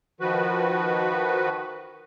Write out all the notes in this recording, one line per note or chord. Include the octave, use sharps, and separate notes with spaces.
D#3 F3 F#4 B4